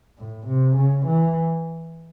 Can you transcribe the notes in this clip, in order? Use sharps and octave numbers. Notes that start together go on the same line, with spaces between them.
A2
C3
C#3
E3